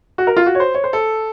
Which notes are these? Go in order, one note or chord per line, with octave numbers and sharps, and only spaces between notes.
F#4
A#4
F4
F#4
C#5
C5
C#5
C5
A4